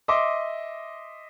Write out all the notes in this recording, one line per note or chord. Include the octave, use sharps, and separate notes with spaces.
D#5 E5 C6 D6